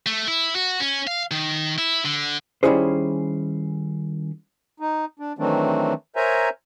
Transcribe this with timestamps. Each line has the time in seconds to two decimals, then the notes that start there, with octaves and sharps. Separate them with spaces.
0.06 A3
0.28 E4
0.55 F#4
0.80 C#4
1.07 F5
1.31 D#3
1.78 E4
2.05 D3
2.63 D#3 G3 C#4 E4 G#4 C5
4.80 D#4
5.19 D4
5.38 D#3 E3 F#3 A3 C4 D4
6.16 A#4 C5 C#5 E5 G#5 A#5